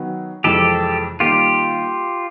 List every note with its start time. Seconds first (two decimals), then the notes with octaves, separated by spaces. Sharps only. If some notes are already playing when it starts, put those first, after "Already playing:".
Already playing: D#3 F#3 B3
0.44 F2 C3 E3 G#3 G4 A4
1.20 D#3 G3 A#3 F4 G4